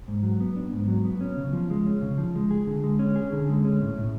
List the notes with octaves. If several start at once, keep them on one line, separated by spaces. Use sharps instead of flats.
G#2
F#3
B3
D4
G#2
F#3
B3
C#4
C#3
F3
G#3
C#4
C#3
F3
G#3
G#4
D3
G#3
C#4
G#4
D3
G#3
C#4
A2
A2